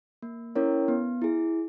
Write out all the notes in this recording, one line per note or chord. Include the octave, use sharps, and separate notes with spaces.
A#3
C#4 E4 A#4 C#5
B3
E4 G#4